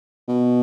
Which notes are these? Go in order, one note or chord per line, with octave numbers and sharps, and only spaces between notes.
B2